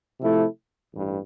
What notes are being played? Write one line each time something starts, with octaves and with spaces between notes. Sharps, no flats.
C3 F3 A3 E4 A4
A1 G2